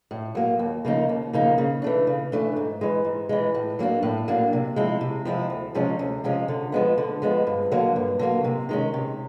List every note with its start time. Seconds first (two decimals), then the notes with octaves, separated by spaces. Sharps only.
0.11 A2
0.35 F#3 A#3
0.59 D#2
0.85 C#3 F3 A#3 D#4
1.09 D#2
1.33 C#3 F3 A#3 D#4
1.58 C#3
1.82 E3 A3 D4
2.07 C#3
2.32 E3 A3 D4
2.56 G#2
2.81 E3 G#3
3.05 G#2
3.29 E3 G#3
3.55 A2
3.79 F#3 A#3 D4
4.03 A2
4.28 F#3 A#3 D4
4.53 C3
4.76 F3 G#3 C4 E4
5.01 C3
5.25 F3 G#3 C4 E4
5.50 D2
5.75 C3 F3 G#3 C#4
5.99 D2
6.24 C3 F3 G#3 C#4
6.48 D3
6.72 F3 G#3 B3
6.98 D3
7.22 F3 G#3 B3
7.47 G2
7.71 D3 F#3 A#3
7.96 G2
8.19 D3 F#3 A#3
8.44 C3
8.69 D#3 G#3 C#4
8.94 C3